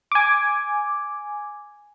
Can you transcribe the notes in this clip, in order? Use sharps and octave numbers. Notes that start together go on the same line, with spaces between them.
G#5 D6